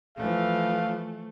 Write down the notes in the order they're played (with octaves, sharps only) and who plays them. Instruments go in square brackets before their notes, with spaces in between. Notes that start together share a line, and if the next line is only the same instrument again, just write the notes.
[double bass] E3 F3 [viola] A3 [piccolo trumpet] F5